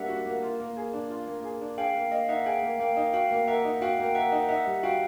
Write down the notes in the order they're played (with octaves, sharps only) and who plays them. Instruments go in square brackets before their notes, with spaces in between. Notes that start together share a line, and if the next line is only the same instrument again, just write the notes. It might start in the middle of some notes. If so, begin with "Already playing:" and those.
Already playing: [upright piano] G3 A#3 D4 [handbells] E5 F#5
[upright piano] F#4
A#3
F4
A#3
G#4
D4
F4
A#3
G#4
D4
[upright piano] G#4 [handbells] F5 G5
[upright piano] A#3
[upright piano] A#3 [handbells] D#5 F5
[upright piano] D#4 [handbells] E5 F#5
[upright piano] G#4 [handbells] F5 G5
[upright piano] A#3
[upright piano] A#3 [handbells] F5 G5
[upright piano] D#4
[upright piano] F#4 [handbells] F5 G5
[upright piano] A#3
[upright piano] A#4 [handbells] E5 F#5
[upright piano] D#4
[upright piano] F#4 [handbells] F5 G5
[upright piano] A#3
[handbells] G5
[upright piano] A#4 [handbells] E5 F#5
[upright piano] D#4
[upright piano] D#4 [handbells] E5 F#5
[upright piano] G3
[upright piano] F#4 [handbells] F5 G5